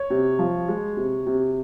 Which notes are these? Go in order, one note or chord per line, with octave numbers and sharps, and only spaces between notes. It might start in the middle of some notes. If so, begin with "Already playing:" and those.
Already playing: C#5
C3
F3
G#3
C3
C3